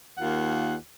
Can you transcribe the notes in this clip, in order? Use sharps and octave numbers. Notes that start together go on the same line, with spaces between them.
D#2 A#3 F4 F#5